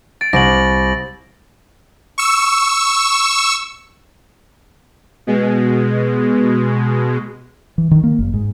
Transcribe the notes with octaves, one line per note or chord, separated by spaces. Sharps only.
A6 D7
C2 A#6 D7 F#7
C#6 E6
B2 G#3
E3
D#3
A#3
F#1
G#2